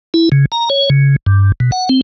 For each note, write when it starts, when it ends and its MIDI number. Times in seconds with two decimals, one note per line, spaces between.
0.14 0.29 64
0.32 0.46 49
0.52 0.69 82
0.70 0.89 73
0.90 1.16 49
1.26 1.52 43
1.60 1.71 47
1.72 1.89 78
1.89 2.01 60